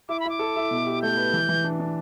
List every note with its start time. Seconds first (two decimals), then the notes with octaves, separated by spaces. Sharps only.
0.09 E4 D6
0.20 B5
0.25 E4 D6
0.39 A4
0.56 E4
0.71 B2
0.86 G4
1.02 A3 G6
1.17 B4
1.33 E3
1.49 E3
1.64 D4
1.80 D4